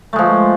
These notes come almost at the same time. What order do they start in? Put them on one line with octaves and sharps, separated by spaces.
A3 G#3 F3